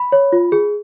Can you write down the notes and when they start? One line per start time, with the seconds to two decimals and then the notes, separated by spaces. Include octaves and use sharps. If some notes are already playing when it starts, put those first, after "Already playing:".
Already playing: B5
0.12 C#5
0.32 F4
0.52 G#4